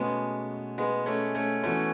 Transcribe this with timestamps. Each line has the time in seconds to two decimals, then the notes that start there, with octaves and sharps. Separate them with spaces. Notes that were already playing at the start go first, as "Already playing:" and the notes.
Already playing: B2 G#3 A3 B3 C#4 G#4
0.78 G#3 B3
1.06 A3 C#4
1.35 A3 C#4
1.63 E3 A3 B3 C#4 F#4 C#5 E5